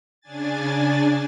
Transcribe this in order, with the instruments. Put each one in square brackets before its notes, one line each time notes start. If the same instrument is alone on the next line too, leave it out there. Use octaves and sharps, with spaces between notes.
[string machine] C#3 D4 G#5 A6